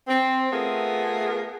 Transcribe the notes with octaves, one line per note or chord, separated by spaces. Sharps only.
C4
A3 B3 F4 G#4 A#4